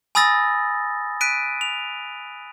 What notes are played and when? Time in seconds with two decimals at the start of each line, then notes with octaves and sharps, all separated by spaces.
0.15 G#5 B5 D#6 E6 A6 A#6
1.21 F#6 B6 D7 D#7
1.61 F7